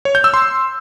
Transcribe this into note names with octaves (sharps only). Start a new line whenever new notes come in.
C#5
G6
E6
C6